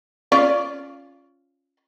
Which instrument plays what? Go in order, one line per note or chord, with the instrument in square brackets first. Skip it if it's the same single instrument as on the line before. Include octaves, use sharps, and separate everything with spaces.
[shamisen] C#4 F4 D5